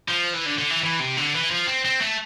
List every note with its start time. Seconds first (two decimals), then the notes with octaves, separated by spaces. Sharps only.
0.08 F3
0.34 E3
0.46 D3
0.58 D3
0.70 E3
0.83 E3
1.00 C3
1.17 D3
1.34 E3
1.50 F3
1.67 C4
1.85 C4
2.01 A3